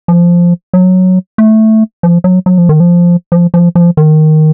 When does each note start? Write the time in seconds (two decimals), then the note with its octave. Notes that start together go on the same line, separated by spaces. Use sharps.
0.08 F3
0.73 F#3
1.38 A3
2.03 F3
2.24 F#3
2.46 F#3
2.57 F3
2.69 D#3
2.80 F3
3.32 F3
3.54 F3
3.75 F3
3.97 D#3